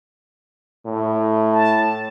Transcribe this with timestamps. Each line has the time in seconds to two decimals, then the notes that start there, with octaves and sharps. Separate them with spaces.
0.85 A2
1.53 A5